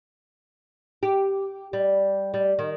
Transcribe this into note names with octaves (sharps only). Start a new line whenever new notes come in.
G4
G3
G3
D#3